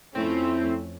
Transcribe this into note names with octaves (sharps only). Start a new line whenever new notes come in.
F2 A3 C4 C#4 E4